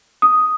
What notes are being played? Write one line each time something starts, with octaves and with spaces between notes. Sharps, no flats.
D#6